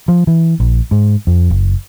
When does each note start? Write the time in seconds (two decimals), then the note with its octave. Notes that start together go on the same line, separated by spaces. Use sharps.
0.08 F3
0.27 E3
0.60 A#1
0.91 G#2
1.27 F2
1.50 F#1